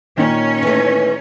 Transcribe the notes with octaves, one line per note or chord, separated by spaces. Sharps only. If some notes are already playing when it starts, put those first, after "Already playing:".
A#2 D#3 C#4
E3 A3